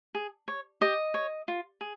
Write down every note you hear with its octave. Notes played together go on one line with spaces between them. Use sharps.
G#4
C#5
G4 D#5
C#5
F4
G#4